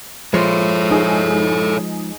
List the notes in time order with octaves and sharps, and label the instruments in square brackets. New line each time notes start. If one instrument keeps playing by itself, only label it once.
[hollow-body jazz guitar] F3 G#3 [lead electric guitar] A4 C#5
[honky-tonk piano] D#4 G#4